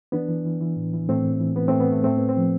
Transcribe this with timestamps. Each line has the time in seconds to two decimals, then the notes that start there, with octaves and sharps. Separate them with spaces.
0.12 E3 B3 D4
0.29 E3
0.45 E3
0.61 E3
0.76 A2
0.93 E3
1.09 A2 A3 C4
1.25 A2
1.40 E3
1.56 E3 B3
1.68 A2 A3 C4
1.80 B3
1.88 A2 A3
2.04 A2 A3 C4
2.17 A2 B3
2.29 A3 C4
2.37 F3